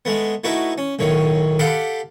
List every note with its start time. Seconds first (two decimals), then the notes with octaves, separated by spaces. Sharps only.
0.05 G#3 A3 B3
0.44 A3 D#4 E4 F#4 B4
0.78 C#4
0.99 B1 A2 D#3 C#5
1.59 G4 A4 F5 F#5 B5 D6